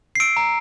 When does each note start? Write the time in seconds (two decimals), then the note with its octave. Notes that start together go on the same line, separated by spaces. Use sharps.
0.15 C7
0.20 E6 D7
0.37 A#5